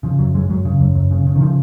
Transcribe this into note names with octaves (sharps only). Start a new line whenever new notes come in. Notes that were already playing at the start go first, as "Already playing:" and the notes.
C#3 F3
F#2 F#3
F#2 G#3
F#2 F#3
C#3
F#2
F#2
C#3
C#3
D#3
C#3 F3